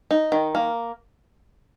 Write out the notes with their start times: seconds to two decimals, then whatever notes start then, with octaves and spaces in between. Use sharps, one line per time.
0.11 D#4
0.32 D#3
0.55 A#3